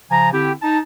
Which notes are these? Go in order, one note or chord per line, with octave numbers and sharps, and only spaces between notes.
C#3 F3 G#5 A#5
D3 C4 E4 G4
D#4 A5